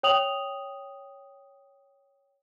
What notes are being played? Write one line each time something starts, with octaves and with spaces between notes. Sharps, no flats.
C#5 G5 D#6 F7 F#7